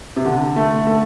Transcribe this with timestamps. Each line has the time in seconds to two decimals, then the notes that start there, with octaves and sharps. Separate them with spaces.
0.16 C3
0.25 D3
0.56 A3
0.87 A3